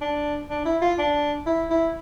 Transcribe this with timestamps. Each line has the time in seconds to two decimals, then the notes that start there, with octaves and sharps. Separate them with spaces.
0.01 D4
0.50 D4
0.65 E4
0.82 F4
0.98 D4
1.46 E4
1.70 E4